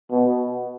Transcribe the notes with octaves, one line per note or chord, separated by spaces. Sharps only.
B2